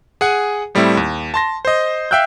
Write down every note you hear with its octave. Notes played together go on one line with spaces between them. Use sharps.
G#4 F#5 G#5
A2 G3 A3 C4 E4
D#2
A5 C6 A#6
C5 D#5
E5 F5 G5 E6 F#6 G6